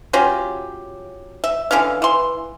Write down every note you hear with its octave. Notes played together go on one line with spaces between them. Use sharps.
F#3 C#4 F4 G4
E5
D3 E3 C#4 F5
E3 C6